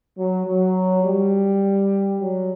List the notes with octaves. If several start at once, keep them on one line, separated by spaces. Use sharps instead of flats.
F#3
F#3
G3
F#3